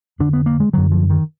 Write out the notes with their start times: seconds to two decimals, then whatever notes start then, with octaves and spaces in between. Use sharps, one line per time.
0.19 F2 D3 D4
0.33 B3
0.46 A#3
0.60 G#3
0.73 F#2 D3 F#3
0.92 F3
1.10 D#3